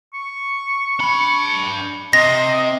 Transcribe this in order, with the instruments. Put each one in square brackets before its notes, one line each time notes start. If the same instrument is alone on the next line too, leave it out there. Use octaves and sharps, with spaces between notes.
[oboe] C#6
[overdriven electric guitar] D4 B5
[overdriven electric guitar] C3 [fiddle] D#5 [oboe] C6 [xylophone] A#6